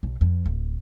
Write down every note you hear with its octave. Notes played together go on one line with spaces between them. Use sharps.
B1
F2
D1